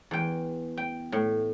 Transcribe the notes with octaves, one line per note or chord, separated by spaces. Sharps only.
E2 G5
G5
A2